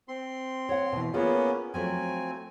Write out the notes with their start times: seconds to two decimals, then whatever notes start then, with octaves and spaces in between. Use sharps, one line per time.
0.08 C4 C6
0.69 C#5 F#5
0.92 B2 E3
1.13 A#3 B3 C#4 F4 G#4 D5
1.74 F3 F#3 A3 C4 G#5